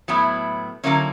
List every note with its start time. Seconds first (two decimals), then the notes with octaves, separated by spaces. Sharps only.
0.08 A2 F#3 B3 E4
0.84 D3 F#3 A#3 C#4 E4